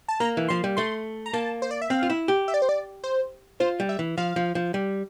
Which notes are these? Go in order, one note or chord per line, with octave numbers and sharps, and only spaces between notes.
A5
A#3 A#5
E3
F3 C6
G3
A3 C6
A#5
A#3 A5
C5
D5
E5
C4 F5
F4
E4
G4
E5
D5
C5
D5
C5
F4 C5
G3
E5
E3
F3 F5
F3
F3
G3